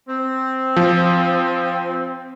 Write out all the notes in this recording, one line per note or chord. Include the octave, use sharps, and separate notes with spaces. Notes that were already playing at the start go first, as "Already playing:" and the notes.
C4
F3